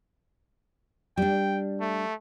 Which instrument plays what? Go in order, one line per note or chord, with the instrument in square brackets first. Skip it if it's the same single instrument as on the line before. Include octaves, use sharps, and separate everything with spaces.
[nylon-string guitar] G3 D4 [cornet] G5
[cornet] A3